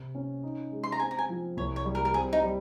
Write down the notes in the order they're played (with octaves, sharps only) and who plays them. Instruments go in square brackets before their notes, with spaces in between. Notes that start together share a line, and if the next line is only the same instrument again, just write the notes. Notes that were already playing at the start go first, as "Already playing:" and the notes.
Already playing: [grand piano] C3
C#4
D#4
G#3
[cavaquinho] C6
A#5
[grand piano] C4 [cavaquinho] G#5
[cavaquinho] A#5
G#5
[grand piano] F3
[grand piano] C2 [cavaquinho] C#5
[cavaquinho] C#5
[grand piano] G3
[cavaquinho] A#4
A#4
[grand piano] C4 [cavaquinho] G#4
[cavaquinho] D#4
[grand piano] G3